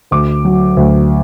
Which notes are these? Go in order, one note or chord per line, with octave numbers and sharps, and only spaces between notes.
D2 D6
F#3
D2